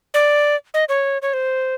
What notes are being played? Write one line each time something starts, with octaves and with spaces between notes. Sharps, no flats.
D5
D#5
C#5
C#5
C5